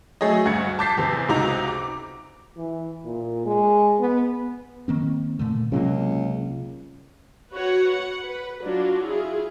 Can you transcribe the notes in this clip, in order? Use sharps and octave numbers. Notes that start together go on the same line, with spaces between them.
F#3 A3 G#4 C#5 D#5
D2 G2 G#6 C#7
A5 D6 G6 A6 B6 C7
E2 C3
C#2 C3 D#4 F#4 A#5 F7
D6
E3
A#2
G#3
B3
D#3 A#3 C4
A#2 D3 A3
C#2 C3 F#3 A#3
F#4 B4 C#5 F#5
F#5
B4
F#3 D4 F4 F#4
E4 F4 G#4